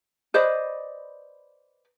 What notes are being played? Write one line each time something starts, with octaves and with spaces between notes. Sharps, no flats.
B4 C5 D5 D#5